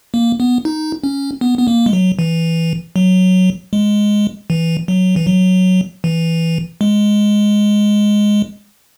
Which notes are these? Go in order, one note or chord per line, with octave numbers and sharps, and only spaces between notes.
A#3
B3
D#4
C#4
B3
B3
A#3
G#3
F#3
E3
F#3
G#3
E3
F#3
E3
F#3
E3
G#3